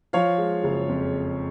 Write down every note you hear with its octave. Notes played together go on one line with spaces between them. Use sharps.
F3 C#5 F5
G#3
F#1
F2